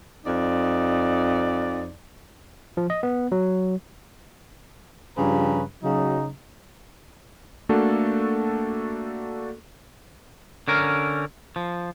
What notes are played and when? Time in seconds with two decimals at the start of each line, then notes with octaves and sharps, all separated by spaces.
0.25 F2 D#4 D5
2.77 F3
2.90 D#5
3.03 B3
3.32 F#3
5.17 G2 C#3 F3 G4 B4 A#5
5.83 C#3 F#3 D#4
7.69 A3 A#3 D4 F#4 A4
10.68 D3 C#4 A#4
11.56 F3